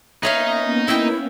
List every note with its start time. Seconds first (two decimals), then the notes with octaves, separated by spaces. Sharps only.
0.23 A#3 B3 C#4 D#4 B4 C#5 E5 F5
0.88 E4 E5 G5